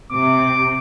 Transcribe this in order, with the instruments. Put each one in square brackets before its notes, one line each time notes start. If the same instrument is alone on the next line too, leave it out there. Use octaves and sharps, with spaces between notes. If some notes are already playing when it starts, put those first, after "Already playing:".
[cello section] C3 [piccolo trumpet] D6